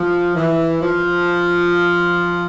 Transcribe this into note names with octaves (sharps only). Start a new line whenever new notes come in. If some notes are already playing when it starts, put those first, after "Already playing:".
Already playing: F3
E3
F3